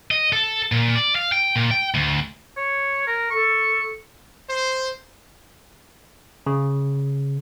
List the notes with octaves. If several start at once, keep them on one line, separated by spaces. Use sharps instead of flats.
D#5
A4
A#2
D5
F5
G5
A#2
G5
D2
C#5
A#4
A4 C#6
C5
C#3